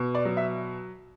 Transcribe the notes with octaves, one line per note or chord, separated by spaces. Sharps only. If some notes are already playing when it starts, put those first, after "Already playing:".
Already playing: B2
D5
F#3
E5